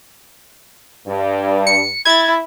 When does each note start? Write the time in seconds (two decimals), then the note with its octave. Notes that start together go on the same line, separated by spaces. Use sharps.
1.07 G2
1.67 C#7
2.05 E4 G#6 A6